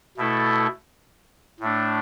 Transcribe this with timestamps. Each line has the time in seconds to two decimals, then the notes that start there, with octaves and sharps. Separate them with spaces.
0.17 B2 A3 E4 A4
1.60 A2 A3 D4